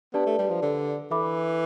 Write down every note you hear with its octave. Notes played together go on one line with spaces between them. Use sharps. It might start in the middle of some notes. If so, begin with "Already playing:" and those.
B3 D4 G4 B4 D5 A5
A3
G3
F3
D3
E3 A4 E5 B5 D6